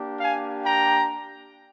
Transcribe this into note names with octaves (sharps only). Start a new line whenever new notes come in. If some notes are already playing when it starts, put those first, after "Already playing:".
Already playing: A#3 D4 G4
F5 G#5
G5 A#5